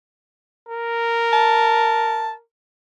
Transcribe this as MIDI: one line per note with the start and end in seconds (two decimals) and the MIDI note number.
0.69 2.42 70
1.33 2.32 81